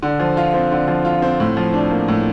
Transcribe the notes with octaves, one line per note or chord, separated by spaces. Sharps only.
D3
F3
F4
C4
D3
F3
F4
C4
A2
F3
D4
A#3
A2